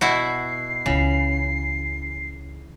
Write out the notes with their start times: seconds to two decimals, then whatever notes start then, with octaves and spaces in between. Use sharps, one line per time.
0.01 B2 E4 F#4 C7
0.86 C#2 C#3 E3